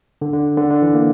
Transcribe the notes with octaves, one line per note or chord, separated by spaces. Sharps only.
D3
D3
D3
D3
E3
A#3